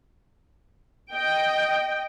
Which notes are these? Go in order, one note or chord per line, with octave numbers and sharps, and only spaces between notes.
D#5 G5